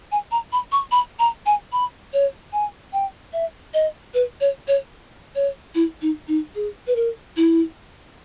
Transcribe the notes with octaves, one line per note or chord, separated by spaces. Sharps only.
G#5
A#5
B5
C#6
B5
A#5
G#5
B5
C#5
G#5
G5
E5
D#5
B4
C#5
C#5
C#5
E4
D#4
D#4
G#4
B4
A#4
E4